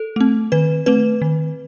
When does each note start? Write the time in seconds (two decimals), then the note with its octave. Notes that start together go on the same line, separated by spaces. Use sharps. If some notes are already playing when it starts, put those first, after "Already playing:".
Already playing: A4
0.16 A3 C4
0.52 D#3 B4
0.86 A3 C4 B4
1.22 D#3